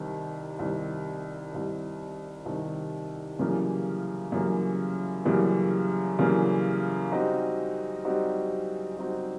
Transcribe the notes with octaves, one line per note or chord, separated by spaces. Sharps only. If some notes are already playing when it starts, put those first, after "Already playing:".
Already playing: C2 C3 D#3
C2 C3 D#3
C2 C3 D#3
C2 C3 D#3
F#2 C#3 E3 G3 A#3
F#2 C#3 E3 G3 A#3
F#2 C#3 E3 G3 A#3
F#2 C#3 E3 G3 A#3
G3 C4 D#4 F#4
G3 C4 D#4 F#4
G3 C4 D#4 F#4